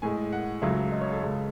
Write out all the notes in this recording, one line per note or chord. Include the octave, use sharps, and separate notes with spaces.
A2 G#3 G#5
F#5
C#2 C#3 F#3 A3 E5
D#5
C#5
A4
C#2 C#3 G#3